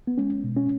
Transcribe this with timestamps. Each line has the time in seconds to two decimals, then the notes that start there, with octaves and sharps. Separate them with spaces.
0.07 B3
0.18 G#3 C#4
0.44 B2
0.57 C#4